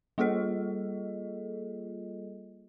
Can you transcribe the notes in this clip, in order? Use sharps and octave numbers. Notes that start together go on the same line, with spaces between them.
G3 A#3 F4 G#4 A4 D#5